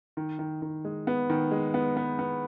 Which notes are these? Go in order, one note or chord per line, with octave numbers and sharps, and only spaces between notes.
D#3
D#3
D#3
G#3
B3
D#3
G#3
B3
B3
B3